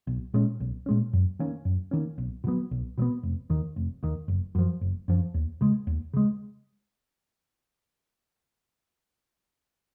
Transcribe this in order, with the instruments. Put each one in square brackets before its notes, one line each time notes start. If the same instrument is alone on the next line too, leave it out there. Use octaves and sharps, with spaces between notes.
[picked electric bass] B1
A#2 G#3 C#4
B1
A#2 G#3 C#4
F#2
D#3 A#3 C#4
F#2
D#3 A#3 C#4
B1
B2
F#3 B3
B1
B2 F#3
B3
F1
D#2 D#3
F1
D#2 D#3
F#1
F#2 F3
F#1
F#2 F3
D#2
C#3 G#3
D#2
C#3 G#3